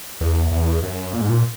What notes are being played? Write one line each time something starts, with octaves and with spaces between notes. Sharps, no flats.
E2
E2
F#2
A#2
G#2
A#2